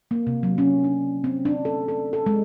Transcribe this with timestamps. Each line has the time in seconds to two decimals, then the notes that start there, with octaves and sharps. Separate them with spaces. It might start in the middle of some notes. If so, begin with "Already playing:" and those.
0.11 A#3
0.27 C3
0.43 F#3
0.58 C#4
0.84 D4
1.24 C4
1.45 D4
1.65 A4
1.88 A4
2.13 A4
2.26 G#3